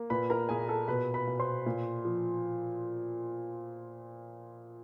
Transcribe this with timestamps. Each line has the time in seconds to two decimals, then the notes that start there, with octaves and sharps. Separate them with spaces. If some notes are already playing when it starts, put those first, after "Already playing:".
Already playing: A#3
0.10 A#2 B4 B5
0.30 A#4 A#5
0.49 A#2 G#4 G#5
0.68 A4 A5
0.88 B2 B4 B5
1.14 B4 B5
1.27 B2
1.39 C5 C6
1.66 A#2
2.05 F3